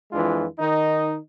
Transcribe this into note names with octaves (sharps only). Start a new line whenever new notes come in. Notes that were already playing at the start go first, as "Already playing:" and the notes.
F2 E3 G#3 D4 F4
D#3 D#4